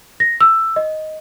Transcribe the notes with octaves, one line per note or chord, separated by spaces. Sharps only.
A#6
E6
D#5